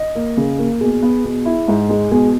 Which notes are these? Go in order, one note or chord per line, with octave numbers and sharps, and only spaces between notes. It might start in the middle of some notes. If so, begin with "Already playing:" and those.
Already playing: D#5
A#3
C#3
A#3
B2 G#4
B3
B2
E4
G#2
G#3
B2 G#4